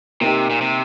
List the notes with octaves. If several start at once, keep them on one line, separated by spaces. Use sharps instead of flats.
C3 A#3 D#4 G4
A#2
C3